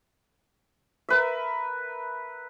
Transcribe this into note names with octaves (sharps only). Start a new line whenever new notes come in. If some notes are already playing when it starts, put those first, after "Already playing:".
A#4 B4 E5